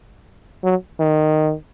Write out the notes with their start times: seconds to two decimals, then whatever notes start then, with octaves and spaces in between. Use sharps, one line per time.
0.64 F#3
1.00 D#3